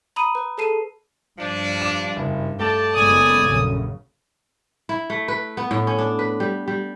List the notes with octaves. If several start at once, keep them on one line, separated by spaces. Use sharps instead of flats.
A#5 B5 D#6 D#7
B4
G#4 A4 A5 C7 D#7
G2 F3 D4
D6 E7
F#1
A3 G4 D5 A5
F#1 G#3 B3 D5 G#5 D#6
A#1 F#2 C#3
E4
A3
B4
B3
A2
C#4
D4
B4
G3
G3